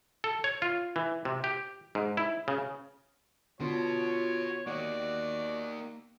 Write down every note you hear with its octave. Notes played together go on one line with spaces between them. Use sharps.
A4
C#5
F4
E3
C3
G4
G#2
E4
C#3
D3 B3 D4 F4 F#4 B4 C#5
A#3 D#4 F#4 D5